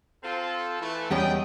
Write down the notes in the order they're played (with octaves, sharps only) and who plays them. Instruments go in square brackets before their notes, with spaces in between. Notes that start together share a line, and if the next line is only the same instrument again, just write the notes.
[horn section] C4 F4 A4
E3 A3
[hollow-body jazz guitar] E2 G3 C#4 [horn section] G#4 D#5 G5